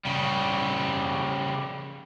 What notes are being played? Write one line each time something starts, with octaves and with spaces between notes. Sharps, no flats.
C#3 G3